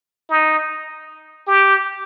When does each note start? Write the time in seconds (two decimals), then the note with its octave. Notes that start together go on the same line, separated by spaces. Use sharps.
0.29 D#4
1.47 G4